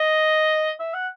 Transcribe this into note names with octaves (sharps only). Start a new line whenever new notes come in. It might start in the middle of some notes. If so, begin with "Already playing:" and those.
Already playing: D#5
E5
F#5